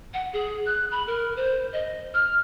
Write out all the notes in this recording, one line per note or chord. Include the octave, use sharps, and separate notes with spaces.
F#5
G#4
F#6
B5
A#4
C5
D#5
F6